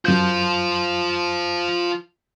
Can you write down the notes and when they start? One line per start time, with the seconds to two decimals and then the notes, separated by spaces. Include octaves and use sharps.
0.05 F#2 F4 C5 G6